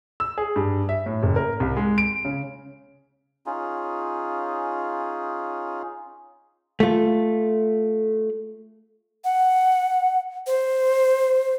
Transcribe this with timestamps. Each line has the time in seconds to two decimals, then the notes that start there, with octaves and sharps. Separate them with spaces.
0.20 E6
0.38 G#4
0.56 G2
0.89 E5
1.06 A2
1.23 F#1
1.36 A#4
1.60 C2
1.77 G#3
1.98 D7
2.25 C#3
3.46 C#4 D#4 F4 G#4
6.80 A3 F4
9.25 F#5
10.47 C5